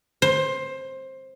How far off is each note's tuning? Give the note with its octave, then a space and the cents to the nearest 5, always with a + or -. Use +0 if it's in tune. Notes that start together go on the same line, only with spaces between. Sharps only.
C5 +15